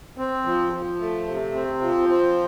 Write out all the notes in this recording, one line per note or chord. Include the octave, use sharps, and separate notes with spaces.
C4
F3
F3
A3
C3
C4
F3
C4